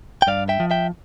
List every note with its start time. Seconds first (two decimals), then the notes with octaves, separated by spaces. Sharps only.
0.22 G5
0.27 G2 D5 F5
0.49 E5 G5
0.60 F3
0.71 E5 G5